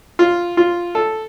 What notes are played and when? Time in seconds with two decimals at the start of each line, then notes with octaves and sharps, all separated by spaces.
0.19 F4
0.57 F4
0.95 A4